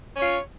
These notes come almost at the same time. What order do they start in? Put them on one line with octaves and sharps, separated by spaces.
C#4 C#5 F4